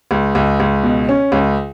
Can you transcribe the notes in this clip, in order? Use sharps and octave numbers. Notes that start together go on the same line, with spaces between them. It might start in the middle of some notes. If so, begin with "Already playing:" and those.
C#2
C#2
C#2
B2
C#4
C#2